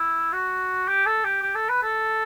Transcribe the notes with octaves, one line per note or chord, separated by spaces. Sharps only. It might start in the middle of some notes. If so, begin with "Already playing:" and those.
Already playing: E4
F#4
G4
A4
G4
G4
A4
B4
A4